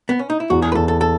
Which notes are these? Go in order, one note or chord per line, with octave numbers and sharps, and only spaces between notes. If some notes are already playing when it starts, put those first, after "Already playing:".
B3
C#4
D#4
E4
E2 F#4
G#4
B4
E2 A4
A4
A4